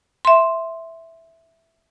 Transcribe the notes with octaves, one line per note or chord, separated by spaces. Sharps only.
E5 C6